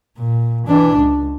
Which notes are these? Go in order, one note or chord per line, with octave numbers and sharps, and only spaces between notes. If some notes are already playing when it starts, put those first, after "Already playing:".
A#2
E3 D4
C#2